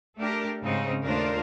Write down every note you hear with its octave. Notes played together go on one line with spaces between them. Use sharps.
A3 D4 G4 A#4
G#2 C#3 C4 D#4
D#2 A3 D4 F4 A#4 C5